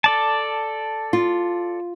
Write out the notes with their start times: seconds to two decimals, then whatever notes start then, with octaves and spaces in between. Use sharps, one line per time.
0.04 A4 D5 A5
1.13 F4